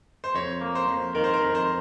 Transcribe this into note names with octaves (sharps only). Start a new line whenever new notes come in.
C5
F2 C#5
A#3
C5
F2
D#3 A#4
C5
A#4
F2
C5